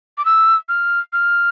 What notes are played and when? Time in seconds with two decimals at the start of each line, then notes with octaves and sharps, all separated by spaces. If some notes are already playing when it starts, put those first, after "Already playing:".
0.18 D6
0.25 E6
0.69 F6
1.13 F6